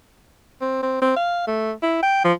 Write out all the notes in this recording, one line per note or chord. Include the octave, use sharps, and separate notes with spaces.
C4
C4
C4
F5
A3
E4
G5
F3